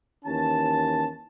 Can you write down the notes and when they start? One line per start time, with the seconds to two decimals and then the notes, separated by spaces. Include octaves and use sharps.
0.25 D#2 E3 C#4 A5